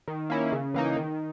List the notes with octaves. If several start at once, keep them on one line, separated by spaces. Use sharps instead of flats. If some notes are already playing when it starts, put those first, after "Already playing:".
D#3
A#3 C#4 E4
C#3
E3 A#3 D#4
D#3